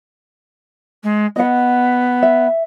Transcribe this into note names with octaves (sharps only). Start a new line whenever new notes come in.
G#3
B3 D#5 F#5
E5